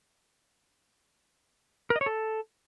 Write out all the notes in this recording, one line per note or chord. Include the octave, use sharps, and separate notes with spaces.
A#4
D#5
C#5
A4